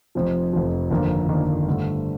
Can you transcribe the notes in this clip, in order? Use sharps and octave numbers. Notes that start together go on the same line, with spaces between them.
F1 F2 C3 F3
F1 F2 C3 F3
G1 F2 D#3 A#3 D4
G1 F2 D#3 A#3 D4
G2 D3 A3